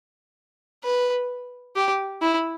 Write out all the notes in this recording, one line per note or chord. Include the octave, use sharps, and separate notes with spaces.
B4
G4
E4